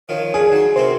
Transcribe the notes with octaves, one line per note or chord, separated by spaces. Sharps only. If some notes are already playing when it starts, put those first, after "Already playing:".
D#3 F3 C#5
C#4 D4 G#4
F#3 D#4 C6
C3 C4 F#4 A#4 C5